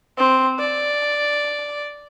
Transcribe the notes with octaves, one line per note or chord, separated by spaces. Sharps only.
C4
D5